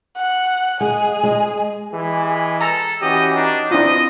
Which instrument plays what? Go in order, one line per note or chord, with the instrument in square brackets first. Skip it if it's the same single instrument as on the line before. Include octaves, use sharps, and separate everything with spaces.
[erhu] F#5
[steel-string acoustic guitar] G#3 [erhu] G#4
[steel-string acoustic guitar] G#3
[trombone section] E3 G#3 G4 [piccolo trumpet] G#5
[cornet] A4 [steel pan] A#5
[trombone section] E3 C#4 F#4 [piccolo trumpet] G4 [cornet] D#5
[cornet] D4 [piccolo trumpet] D#4
[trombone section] C4 [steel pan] D4 E4 F4 [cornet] D#5 [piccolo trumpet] D#6